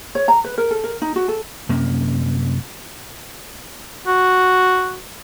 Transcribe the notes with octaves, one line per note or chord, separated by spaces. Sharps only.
C#5
A#5
B4
A#4
A4
A#4
D#4
F#4
A4
F#2 C3 A#3 C#4
F#4